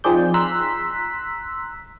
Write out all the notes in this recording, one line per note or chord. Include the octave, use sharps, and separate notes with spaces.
F3 C4 D#4 G#4 D5 G6
A#5 C6 E6 F#6 B6